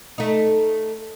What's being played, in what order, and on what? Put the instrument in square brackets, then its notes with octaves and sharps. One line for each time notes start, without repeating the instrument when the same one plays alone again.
[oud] A3 D#4